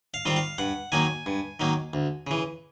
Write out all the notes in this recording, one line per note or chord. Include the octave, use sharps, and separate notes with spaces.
F5
D#3 G3 C4 F4
F5
G2 F#5
D#3 F#3 A#3 D#4 G#5
G2
D#3 F#3 A#3 D#4
D2
C#3 E3